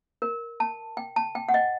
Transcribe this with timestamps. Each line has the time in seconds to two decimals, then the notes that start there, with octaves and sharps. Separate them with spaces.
0.22 A#4
0.60 A5
0.97 G5
1.16 A5
1.35 G5
1.49 F#5
1.54 D#5